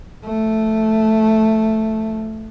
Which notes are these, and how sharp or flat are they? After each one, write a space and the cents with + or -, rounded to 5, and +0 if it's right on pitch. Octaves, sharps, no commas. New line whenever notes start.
F3 +0 A3 +0